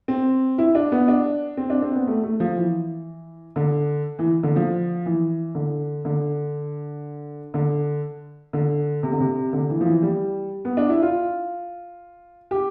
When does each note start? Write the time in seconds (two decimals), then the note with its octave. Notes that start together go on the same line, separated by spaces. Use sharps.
0.08 C4
0.58 E4
0.75 D4
0.92 B3
1.08 D4
1.57 C4
1.70 D4
1.82 C4
1.95 B3
2.07 A3
2.24 A3
2.40 F3
2.57 E3
3.56 D3
4.19 E3
4.43 D3
4.56 F3
5.06 E3
5.55 D3
6.05 D3
7.54 D3
8.53 D3
9.03 C3
9.12 D3
9.20 C3
9.53 D3
9.70 E3
9.81 F3
9.86 E3
10.03 G3
10.65 B3
10.77 D4
10.89 E4
11.02 F4
12.51 G4